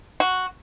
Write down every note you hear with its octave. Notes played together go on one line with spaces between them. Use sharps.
F#4